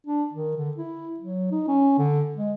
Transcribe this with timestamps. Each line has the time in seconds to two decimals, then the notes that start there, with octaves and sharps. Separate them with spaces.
0.06 D4
0.33 D#3
0.57 D3
0.77 E4
1.20 F#3
1.51 D#4
1.68 C#4
1.98 D3
2.36 G#3